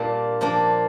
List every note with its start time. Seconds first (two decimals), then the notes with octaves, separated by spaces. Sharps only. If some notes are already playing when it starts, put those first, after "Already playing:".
Already playing: A#2 G3 A#3 D4 D5
0.41 F3 A#3 D4